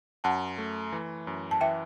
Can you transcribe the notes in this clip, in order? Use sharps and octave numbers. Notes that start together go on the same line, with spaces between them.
F#2 F#5 A5
A3
E3
F#2
A5
E3 E5 G5